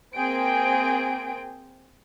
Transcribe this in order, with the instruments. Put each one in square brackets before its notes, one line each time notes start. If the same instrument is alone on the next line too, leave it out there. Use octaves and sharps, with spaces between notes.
[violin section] A#3 C4 G#4 G5 D7